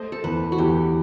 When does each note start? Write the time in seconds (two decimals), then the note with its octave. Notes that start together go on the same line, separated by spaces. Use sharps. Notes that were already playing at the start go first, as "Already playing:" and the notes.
Already playing: A3 C5 D#5
0.12 A4
0.24 E2 B4
0.52 F#4
0.58 E2 G4